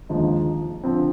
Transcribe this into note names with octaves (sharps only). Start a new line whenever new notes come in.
D#2 D3 F3 G#3 D#4
D3 F3 C4